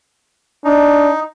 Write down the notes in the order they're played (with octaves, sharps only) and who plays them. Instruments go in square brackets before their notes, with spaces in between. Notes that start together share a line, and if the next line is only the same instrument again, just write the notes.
[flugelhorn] D4 [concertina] D#4